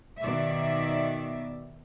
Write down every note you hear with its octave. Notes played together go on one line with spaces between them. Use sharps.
B2 D#3 D5 E5